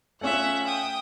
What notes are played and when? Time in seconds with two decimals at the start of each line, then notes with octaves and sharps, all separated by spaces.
0.21 A3 C#4 F4 E5 F#5
0.65 G5 D#6